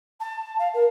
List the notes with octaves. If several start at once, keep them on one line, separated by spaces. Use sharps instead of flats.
A5
F5
A#4